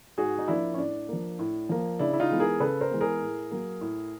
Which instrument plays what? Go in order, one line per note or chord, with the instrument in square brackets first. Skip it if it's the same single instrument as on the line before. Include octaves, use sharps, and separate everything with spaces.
[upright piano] G#2 F#4 G#4
D#4
F3 A#3 D4 E4
C#4
A2 D4
F3 A#3
A2
F3 A#3
C#3 D4 E4
E4
D#4 F4
E3 G#3 B3
G#4 A#4
C#3 A4 B4
A#4 C5
E3 G#3 B3
G#4 A#4
A2
F#3 A#3
A2